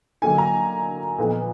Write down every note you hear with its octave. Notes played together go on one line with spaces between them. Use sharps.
D3 F#3 A#3 D#4 G#5
A#5
A#2 F3 B3 D#4